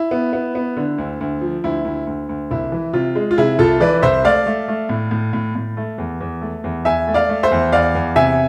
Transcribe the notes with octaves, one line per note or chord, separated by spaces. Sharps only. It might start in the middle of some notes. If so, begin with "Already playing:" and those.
Already playing: E4
B3
B3
B3
D3
D2
D2
F3
D2 E4
D2
D2
D2
C2 E4
E3
C3 F4
G#3
F4
C3 E4 G#4
C2 F4 A4
E3 B4 D5
C2 C5 E5
A3 D5 F5
A3
A3
A2
A2
A2
A2
A3
E2
E2
A3
E2
E2 E5 G#5
A3
D5 F5
A3
C5 E5
E2
E2 D5 F5
E2
C3 E5 G#5